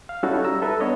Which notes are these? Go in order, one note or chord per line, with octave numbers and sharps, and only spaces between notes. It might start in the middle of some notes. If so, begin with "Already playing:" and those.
F5
G3 C#4 D#4 E4 F#4 A4
G3 A#5 E6
A4 B4 E5
B3 D4 C#5 D#5